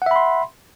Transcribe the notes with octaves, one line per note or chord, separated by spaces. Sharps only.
E5 F#5 B5 C6